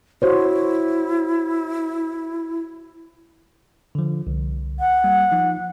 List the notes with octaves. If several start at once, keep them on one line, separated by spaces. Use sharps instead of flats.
E4 F#4 C5 C#5
D3 F3
C2
F#5
G3 A#3
F3 D#4